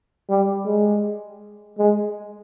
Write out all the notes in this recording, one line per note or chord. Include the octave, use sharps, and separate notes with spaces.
G3
G#3
G#3